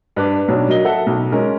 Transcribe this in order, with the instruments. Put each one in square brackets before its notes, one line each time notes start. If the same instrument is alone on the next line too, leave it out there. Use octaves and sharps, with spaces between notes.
[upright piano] G2 B4 D6
B1 D4 C#5
F#3 A#4 D#5 G7
A4 E5 F#5
B1
G#3 C#4 A#4